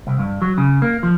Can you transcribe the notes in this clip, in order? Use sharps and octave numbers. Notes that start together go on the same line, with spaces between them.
C2
G2
F#3
C#3
A#3
F3